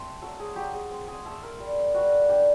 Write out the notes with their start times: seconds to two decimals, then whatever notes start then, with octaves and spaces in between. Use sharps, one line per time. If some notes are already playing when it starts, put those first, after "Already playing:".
Already playing: A3 C4
0.22 F#3 A4
0.39 G#4
0.56 F#3 G4
0.73 G#4
0.91 C4
1.08 G#4
1.25 A3 A4
1.43 A#4
1.60 G3
1.94 G3 F#4
2.29 D4 G4